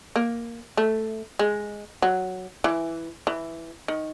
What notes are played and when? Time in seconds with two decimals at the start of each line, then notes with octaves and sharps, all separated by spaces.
0.16 A#3
0.77 A3
1.39 G#3
2.02 F#3
2.64 E3
3.27 E3
3.88 D#3